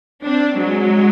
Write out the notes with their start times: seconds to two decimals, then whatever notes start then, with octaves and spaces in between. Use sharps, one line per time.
0.24 C4 D4
0.59 F#3 G#3